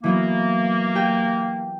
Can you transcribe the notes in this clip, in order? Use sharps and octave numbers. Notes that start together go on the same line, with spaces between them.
E3 F#3 A#3 B3
G4 G5